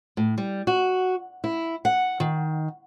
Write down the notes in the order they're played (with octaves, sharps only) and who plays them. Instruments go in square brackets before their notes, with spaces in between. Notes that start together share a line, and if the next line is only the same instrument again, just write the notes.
[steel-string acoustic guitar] A2
G3
F#4
E4
F#5
D#3